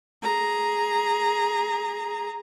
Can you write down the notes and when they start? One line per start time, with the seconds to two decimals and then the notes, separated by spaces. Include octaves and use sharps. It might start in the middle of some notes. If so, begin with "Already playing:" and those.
0.22 G#4 A#5